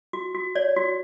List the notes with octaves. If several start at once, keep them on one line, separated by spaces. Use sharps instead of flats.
F#4
F#4
C#5 D5
F#4